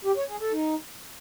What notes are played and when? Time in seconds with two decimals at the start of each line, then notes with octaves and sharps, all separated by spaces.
0.05 G4
0.17 C#5
0.29 G#4
0.40 A4
0.52 D#4